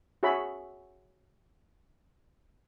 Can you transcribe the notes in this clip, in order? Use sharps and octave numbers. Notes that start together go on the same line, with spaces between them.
F#4 G#4 C#5 E5 B5